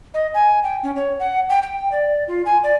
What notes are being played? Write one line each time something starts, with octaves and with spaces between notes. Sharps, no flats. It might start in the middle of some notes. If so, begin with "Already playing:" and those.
D#5
G#5
G5
C#4
C#5
F#5
G5
G5
D5
F4
G#5
D5